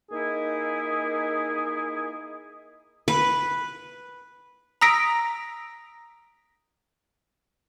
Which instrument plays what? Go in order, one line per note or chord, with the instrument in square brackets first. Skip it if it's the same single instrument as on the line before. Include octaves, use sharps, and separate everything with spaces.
[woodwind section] A#3 D#4 E4 G#4 D#5
[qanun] B4
[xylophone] A#5 D#6 E6 A#6 B6 D7